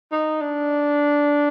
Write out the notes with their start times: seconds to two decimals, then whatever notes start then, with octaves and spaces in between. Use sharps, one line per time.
0.12 D#4
0.41 D4